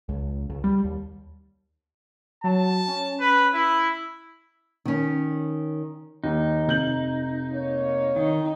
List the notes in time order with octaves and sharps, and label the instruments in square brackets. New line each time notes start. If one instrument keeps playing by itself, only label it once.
[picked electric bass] C#2
C#2
G3
D#2
[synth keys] F#3 [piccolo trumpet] A5
[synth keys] C#4
[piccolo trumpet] B4
E4
[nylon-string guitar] D#3 C#4
[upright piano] D#2 [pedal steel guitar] D#4
[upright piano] F1 G6 F#7
[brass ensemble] A#3 C#5
[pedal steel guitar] D#3 [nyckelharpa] D#4